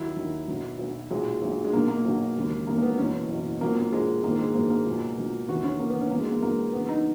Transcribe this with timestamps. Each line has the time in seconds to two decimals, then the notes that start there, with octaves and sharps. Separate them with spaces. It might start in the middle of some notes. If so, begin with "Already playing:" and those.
Already playing: D#2 D#3 F#3 E4
0.17 D#2 D#3 F#3
0.48 B1 B2 F#3
0.79 B1 B2 F#3
1.11 B1 A#2 F#3 G#3
1.42 B1 A#2 F#3
1.64 G#3
1.73 B1 B2 F#3 A#3
1.88 A#3
2.05 B1 B2 F#3
2.36 E1 D#2 C#3
2.67 E1 D#2 C#3 A#3
2.78 A#3
2.83 B3
2.98 F#1 E2 B2 C#4
3.29 F#1 E2 B2
3.61 A#1 A#2 F#3 A#3
3.76 A#3
3.92 A#1 A#2 F#3 G#3
4.23 A#1 G#2 D#3 F#3 A#3
4.39 G#3
4.54 A#1 G#2 D#3 F#3 A#3
4.70 A#3
4.86 C#2 B2 F#3
5.17 C#2 B2 F#3
5.48 D#2 C#3 E3 F#4
5.63 C#4
5.79 D#2 C#3 E3 A#3
5.90 B3
6.01 C#4
6.11 E1 E2 C#3 F#3 A#3
6.21 G#3
6.32 A#3
6.42 E1 E2 C#3 F#3 A#3
6.73 E2 C#3 F#3 B3
6.89 D#4